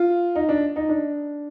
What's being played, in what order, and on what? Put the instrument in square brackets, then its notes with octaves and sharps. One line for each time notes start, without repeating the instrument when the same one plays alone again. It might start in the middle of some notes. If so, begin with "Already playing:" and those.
Already playing: [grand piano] F4
D#4
D4
D#4
D4